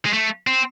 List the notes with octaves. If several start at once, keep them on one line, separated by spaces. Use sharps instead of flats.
G#3
A3
C4